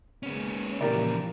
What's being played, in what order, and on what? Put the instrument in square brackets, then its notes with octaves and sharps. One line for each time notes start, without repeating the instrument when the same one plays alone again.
[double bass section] C#3 G#3 A#3 [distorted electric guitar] B3 C#4
[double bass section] A#2 F3 A#3 [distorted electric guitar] C#3 E3 [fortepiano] G4 A#4 D5